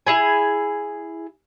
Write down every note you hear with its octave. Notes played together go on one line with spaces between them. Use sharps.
E4 G#4 G#5